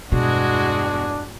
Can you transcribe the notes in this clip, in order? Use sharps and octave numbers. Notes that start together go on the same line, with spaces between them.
E2 G2 B2 G#3 D4 F#4 G#4